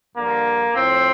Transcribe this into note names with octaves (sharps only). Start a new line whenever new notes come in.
G2 D3 F3 A#3
A2 F3 C4